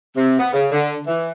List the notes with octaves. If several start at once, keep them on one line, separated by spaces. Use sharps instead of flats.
C3
B3
C#3
D3
E3